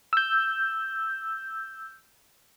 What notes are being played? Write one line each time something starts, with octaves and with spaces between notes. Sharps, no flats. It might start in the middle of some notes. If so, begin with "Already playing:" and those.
E6 G6